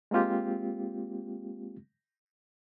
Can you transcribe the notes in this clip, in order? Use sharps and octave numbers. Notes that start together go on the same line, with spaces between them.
G#3 A#3 C4 F4 G4